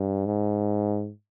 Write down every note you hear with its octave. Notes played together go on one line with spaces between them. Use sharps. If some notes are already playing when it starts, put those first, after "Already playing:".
Already playing: G2
G#2